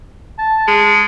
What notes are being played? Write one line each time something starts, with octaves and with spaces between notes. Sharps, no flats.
A5
G#3